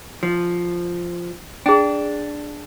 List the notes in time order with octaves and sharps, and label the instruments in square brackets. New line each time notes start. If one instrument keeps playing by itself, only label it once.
[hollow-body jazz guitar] F3
[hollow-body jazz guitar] D4 [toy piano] G#4 G5